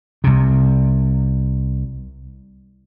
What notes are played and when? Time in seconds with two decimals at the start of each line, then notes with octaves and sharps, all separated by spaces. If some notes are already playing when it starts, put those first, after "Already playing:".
0.24 C2 C3